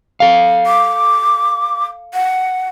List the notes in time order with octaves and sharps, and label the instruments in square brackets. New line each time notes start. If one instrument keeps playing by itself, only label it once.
[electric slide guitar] A4 F5
[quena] D6
F#5